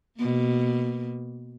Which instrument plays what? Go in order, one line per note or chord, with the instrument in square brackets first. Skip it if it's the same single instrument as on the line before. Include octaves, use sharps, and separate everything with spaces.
[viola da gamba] B2 A#3